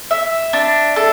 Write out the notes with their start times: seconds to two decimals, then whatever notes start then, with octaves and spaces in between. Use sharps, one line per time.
0.11 E5
0.53 D4
0.96 A4